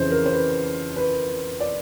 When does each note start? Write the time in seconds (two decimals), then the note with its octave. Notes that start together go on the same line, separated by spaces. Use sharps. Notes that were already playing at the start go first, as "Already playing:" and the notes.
Already playing: F2 C#3 E3 C5
0.11 A#4
0.26 C5
0.32 B4
0.96 B4
1.60 D5